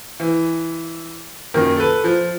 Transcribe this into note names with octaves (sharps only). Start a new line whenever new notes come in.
E3
F#2 A#2 D#3
A4 B4
F3